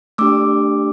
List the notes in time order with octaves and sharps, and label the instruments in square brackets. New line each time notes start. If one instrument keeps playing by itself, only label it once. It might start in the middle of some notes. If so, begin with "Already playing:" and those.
[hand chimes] A3 D4 G4 D6 E6